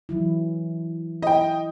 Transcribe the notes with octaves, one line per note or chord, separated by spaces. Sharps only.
E3 F#3 E4
E4 D#5 G5